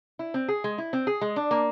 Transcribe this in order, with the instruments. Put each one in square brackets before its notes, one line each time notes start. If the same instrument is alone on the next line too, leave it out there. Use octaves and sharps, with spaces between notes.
[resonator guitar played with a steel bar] E4
C4
G#4
G#3
E4
C4
G#4
G#3
D4
A#3